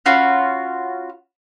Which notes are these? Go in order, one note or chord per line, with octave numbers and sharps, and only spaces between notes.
C#4 F4 F#4 B5